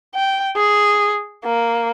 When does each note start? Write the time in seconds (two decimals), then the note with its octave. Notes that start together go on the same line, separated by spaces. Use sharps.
0.15 G5
0.57 G#4
1.45 A#3